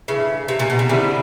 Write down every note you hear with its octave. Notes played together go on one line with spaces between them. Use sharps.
G2 C#3 E3 A3
C3
A#2
B2
C3
D3 D#3 G3 C4 E4 G#4